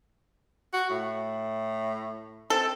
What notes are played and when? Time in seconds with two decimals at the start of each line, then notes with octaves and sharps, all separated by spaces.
0.73 F#4
0.90 A2
2.50 C4 A4